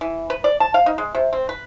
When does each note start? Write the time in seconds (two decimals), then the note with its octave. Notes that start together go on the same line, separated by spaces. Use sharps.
0.01 E3
0.30 B4
0.44 D5
0.60 A5
0.74 F5
0.86 D#4
0.98 G#3
1.15 C3
1.33 C4
1.49 B4